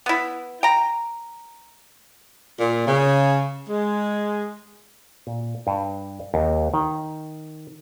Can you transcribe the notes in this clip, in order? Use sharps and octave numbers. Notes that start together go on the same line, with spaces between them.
B3 E4
G5 A#5
A#2
C#3
G#3
A#2
G2
D#2
D#3